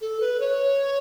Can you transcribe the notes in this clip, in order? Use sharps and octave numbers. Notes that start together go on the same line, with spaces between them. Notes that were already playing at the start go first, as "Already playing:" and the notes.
A4
B4
C#5